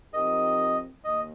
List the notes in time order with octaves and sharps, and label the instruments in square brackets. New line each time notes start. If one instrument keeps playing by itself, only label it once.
[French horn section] F3 C4 D#4 G4 A#4 [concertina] D#5
[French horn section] D#2 [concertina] D#5